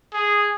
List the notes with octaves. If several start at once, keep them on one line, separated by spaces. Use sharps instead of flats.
G#4